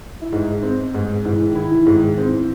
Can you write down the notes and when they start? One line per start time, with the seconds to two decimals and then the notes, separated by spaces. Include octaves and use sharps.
0.21 E4
0.32 G#2 D#4
0.63 C4
0.94 G#2
1.25 G#2 E3
1.48 D#3
1.55 E4
1.71 E3
1.86 G#2
1.95 D#3
2.17 E3 C4